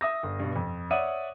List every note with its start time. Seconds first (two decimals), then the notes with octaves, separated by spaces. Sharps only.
0.01 E5 D#6 A#6
0.23 G1
0.40 G2 B2
0.56 F2
0.91 C#5 D5 E5 F#5 D#6 D#7